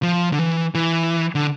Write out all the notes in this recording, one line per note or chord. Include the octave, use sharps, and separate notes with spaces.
F3
D3
E3
E3
D3